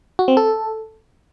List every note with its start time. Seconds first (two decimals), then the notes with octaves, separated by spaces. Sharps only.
0.19 F#4
0.28 C4
0.37 A4